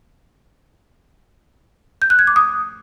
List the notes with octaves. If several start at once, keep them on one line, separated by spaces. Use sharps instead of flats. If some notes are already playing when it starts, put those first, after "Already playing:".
G6
F#6
G#6
D6
D#6